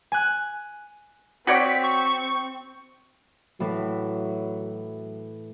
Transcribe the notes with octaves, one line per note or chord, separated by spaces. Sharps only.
G#5 F#6
C4 F#4 C#5 D5 B6
C#6
A2 E3 F#3